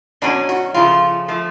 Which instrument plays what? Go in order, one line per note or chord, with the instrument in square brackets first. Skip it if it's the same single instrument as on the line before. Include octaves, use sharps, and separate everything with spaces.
[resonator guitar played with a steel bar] B2 F#3 C#4 D4
F#4
C#3 F3 A3 F4
F3 A3